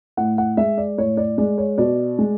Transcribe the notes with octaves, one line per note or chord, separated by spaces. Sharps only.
A2 F#5
F#5
G#3 E5
D5
A2 C#5
D5
G#3 D5
C#5
B2 D5
G#3